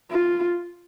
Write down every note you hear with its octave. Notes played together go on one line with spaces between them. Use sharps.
F4